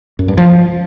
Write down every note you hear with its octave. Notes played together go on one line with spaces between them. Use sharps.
F#2
G2
F3